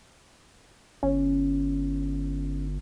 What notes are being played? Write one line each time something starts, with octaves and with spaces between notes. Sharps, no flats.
G1 C#4